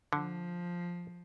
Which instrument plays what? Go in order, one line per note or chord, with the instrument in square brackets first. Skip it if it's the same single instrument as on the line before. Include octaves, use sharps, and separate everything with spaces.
[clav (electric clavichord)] D3 [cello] F3